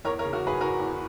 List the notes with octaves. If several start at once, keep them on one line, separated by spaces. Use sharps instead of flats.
E2 A#4 C#5
A#4 C#5
C#3
F#4 A#4
F#1 G#4 B4
F#1 F#4 A#4
E2